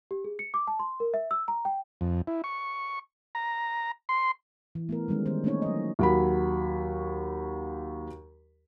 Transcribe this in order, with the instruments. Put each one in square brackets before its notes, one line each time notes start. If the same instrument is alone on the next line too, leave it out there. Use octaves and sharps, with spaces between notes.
[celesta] G4
G#4
C#7
D6
A5
C6
A#4
E5
E6
A#5
G5
[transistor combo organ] F2
E4
C#6
A#5
C6
[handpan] E3
A3 B3 A#4
D#3 G3 G#3 C#4
D#3 B3 C#4 C5
A3 A#3 C4 C#4 D#4 C#5
F#3 D#5
[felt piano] D#2 F#3 B5